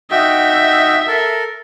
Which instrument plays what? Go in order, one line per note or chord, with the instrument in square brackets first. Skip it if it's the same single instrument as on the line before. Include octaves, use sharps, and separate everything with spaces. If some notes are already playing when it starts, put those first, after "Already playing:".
[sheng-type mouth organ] D#4 F#4 G5 [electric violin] E5
[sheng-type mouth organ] A4 A#4